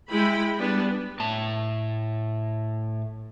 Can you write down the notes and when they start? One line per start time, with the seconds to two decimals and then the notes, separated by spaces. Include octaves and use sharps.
0.10 G#3 E4 G5 B5
0.58 G3 B3 D4 B4
1.20 A2 A5